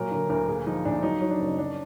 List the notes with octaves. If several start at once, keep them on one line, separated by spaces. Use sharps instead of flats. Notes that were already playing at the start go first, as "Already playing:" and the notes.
Already playing: A#2 F#3 A#4
D3 A#4
D2 A#4
A#2 G#4
F3 D#4
A#2 D4
F#3 D#4
F#3
D4
F#1
F#3 D4